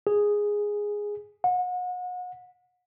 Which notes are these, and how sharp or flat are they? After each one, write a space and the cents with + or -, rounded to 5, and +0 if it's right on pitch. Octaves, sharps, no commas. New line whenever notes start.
G#4 -5
F#5 -35